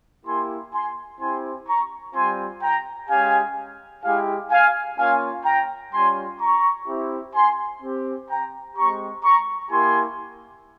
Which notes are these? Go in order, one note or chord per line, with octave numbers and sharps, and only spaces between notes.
A#3 E4 G4 G#5 C6
G#5 C6
C4 E4 G4 G#5 C6
A#5 C#6
G3 C4 F4 G#5 C6
G5 A#5
G#3 C#4 G4 F5 G#5
G#3 E4 G4 F5 G#5
F5 G#5
A#3 C#4 F4 F5 G#5
G5 A#5
G3 C#4 F4 G#5 C6
A#5 C#6
C4 E4 G4
G#5 C6
C4 G4
G5 A#5
G#3 C4 G4 A#5 C#6
A#5 C#6
A#3 E4 G4 G#5 C6